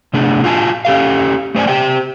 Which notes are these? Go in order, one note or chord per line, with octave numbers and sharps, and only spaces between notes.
C3 A3 B3 D4 G#4
F4 F#4 F5 G#5 A5
C#4 G4 A4 F5
A3 C5 D5 G#5
G4 C5 G5